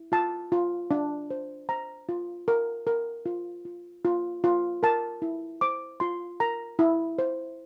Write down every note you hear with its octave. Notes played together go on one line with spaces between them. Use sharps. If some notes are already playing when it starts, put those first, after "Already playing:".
Already playing: E4
F4 A5
F4
D4
C5
C5 A#5
F4
A#4
A#4
F4
F4
F4
F4
A#4 A5
E4
C5 D6
F4 C6
A#4 A#5
E4
C5